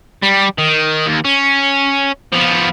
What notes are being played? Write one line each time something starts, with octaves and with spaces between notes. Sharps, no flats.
G3
D#3
D#2
C#4
F3 B3